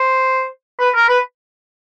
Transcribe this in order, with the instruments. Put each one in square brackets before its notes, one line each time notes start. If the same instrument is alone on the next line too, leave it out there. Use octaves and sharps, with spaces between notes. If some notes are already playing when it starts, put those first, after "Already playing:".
Already playing: [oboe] C5
B4
A#4
B4